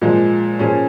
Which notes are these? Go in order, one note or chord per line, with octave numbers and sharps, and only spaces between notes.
A#2 F3 G#3
A#2 F3 C#4 G#4